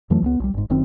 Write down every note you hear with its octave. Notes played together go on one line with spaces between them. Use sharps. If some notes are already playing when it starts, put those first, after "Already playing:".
F2 E3 F#3 A3
C#2 G#3 B3
B1 G3
G1 G#2
F#1 F#2 D#3 C4